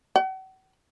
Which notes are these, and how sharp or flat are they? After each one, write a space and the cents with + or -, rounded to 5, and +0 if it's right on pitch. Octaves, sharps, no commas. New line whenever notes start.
F#5 +40